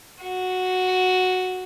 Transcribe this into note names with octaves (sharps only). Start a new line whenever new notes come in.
F#4